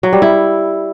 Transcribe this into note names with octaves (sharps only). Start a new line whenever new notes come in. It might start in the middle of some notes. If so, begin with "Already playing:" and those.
F#3
G3
E4